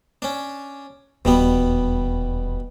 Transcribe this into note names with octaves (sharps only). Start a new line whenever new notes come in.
C#4 D4
D#1 E2 B2 G3 B3